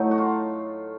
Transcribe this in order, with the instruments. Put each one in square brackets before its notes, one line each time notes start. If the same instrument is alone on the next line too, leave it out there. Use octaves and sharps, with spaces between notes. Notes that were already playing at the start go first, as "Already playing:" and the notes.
Already playing: [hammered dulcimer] A2 F#3 A3 D#4
F#4
F4